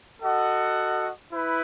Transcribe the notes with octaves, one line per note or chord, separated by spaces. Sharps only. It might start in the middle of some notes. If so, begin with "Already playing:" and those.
F#4 A4 D#5 F#5
E4 B4